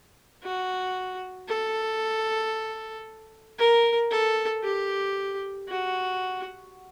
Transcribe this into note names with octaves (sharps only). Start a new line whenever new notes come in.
F#4
A4
A#4
A4
G4
F#4